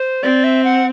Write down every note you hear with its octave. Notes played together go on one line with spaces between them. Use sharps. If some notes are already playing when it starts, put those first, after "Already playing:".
Already playing: C5
C4 D5
E5
F#5